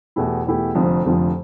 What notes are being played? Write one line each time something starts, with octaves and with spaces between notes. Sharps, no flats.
E2 B2 A3 E4 G4
E2 B2 A3 E4 G4
F1 F2 D3 F3
F1 F2 D3 F3